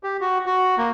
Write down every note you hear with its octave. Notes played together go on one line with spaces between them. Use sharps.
G4
F#4
F#4
A#3